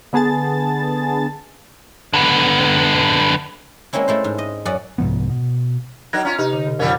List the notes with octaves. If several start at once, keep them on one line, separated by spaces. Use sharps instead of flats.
D3 B3 G#4 A5 A6
D3 B3
G#3 A#3 C4 C#4 E4
G#3 A3 E4 C5
G#2
D#5
F#2 C#4 D5 F#5
C2 G#2 F3 B3
B2
F#3 D#4 A#4 F#6 G#6 A#6
C#4 F4 A#5
C3 D#4 G4
D3
B2
F2 C#3 F3 G3 C#4 A#4